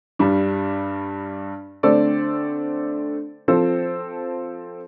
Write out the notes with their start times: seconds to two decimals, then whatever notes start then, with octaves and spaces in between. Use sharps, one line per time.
0.19 G2 G3 D4
1.83 D3 A3 C4 A4 D5
3.48 F3 C4 A4 C5